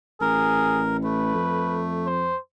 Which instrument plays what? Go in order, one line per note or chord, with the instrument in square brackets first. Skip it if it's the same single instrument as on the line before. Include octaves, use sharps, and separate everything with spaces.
[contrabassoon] A1 [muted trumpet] G#4 [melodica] A#4
[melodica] A3 [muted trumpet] B4
[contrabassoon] F2
[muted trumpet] C5